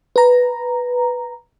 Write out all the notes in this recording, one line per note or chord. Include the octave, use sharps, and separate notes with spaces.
B4 A#5